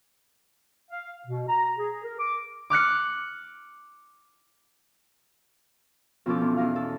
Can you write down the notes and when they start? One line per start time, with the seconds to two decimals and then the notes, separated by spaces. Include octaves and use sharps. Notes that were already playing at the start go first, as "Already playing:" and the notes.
0.91 F5
1.27 B2
1.49 A#5
1.77 G#4
2.04 A#4
2.19 D6
2.70 D6 F6 F#6 C#7
6.26 F2 B2 F3 C#4 A4 D6
6.41 E2
6.57 E2 D#4 F5
6.76 A4